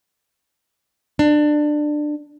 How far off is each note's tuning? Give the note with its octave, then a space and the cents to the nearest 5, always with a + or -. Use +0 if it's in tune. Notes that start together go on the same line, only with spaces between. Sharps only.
D4 +20